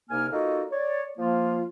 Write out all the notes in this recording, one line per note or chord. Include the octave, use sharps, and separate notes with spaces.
C2 C3 A#3 D#4 G#5 F6
A#3 D#4 F4 F#4 A4 D#5
C#5 D5
F3 A#3 F4